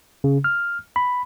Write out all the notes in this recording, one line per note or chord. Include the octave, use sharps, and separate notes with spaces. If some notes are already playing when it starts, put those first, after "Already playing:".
C#3
F6
B5